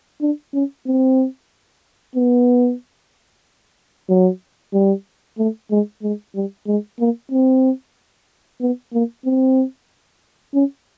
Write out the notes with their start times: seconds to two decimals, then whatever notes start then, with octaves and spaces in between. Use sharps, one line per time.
0.21 D4
0.54 C#4
0.86 C4
2.15 B3
4.09 F#3
4.73 G3
5.38 A3
5.71 G#3
6.03 G#3
6.35 G3
6.67 G#3
6.99 A#3
7.31 C4
8.61 B3
8.93 A#3
9.25 C4
10.54 C#4